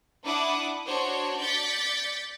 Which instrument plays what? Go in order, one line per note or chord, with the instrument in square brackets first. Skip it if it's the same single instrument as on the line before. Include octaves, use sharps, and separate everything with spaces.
[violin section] D4 E4 F#5 D6 D#6
D4 F#4 C5 C#5
D5 G6 A6 B6 C#7